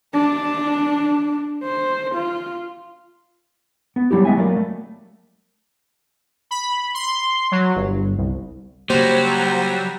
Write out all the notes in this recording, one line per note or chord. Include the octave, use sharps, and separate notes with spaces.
D4
C5
F4
B3
F#3 G3 E4 G4
G#3 B3 E5 G5 G#5
F#3 A3 A#3 D5
A3
B5
C6
F#3
G1
C2
C#3 F#3 G3 A#3 C5